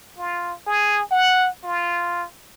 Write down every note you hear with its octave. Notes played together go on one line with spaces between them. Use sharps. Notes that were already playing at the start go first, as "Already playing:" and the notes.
F4
G#4
F#5
F4